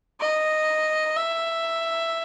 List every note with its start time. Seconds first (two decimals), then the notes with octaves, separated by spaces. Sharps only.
0.21 D#5
1.16 E5